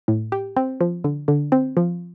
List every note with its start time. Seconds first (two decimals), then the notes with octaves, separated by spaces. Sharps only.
0.08 A2
0.32 G4
0.57 C4
0.81 F3
1.04 D3
1.28 D3
1.52 C4
1.77 F3